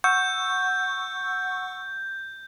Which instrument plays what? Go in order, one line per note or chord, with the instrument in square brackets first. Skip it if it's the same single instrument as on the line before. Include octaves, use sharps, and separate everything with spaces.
[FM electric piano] F#5 C#6 E6 [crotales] G6